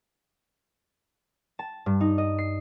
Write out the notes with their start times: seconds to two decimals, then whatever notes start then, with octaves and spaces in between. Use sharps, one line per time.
1.59 A5
1.86 G2
2.01 D#4
2.18 D#5
2.38 C7